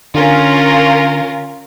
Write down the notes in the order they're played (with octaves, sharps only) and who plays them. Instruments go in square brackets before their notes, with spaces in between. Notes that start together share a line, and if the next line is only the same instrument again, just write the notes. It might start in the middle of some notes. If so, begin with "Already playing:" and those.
[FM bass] D3 [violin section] C#4 F4 A#4